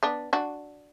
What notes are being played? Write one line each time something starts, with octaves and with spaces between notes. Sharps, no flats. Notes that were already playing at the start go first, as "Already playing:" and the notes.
B3 D4
D4 F#4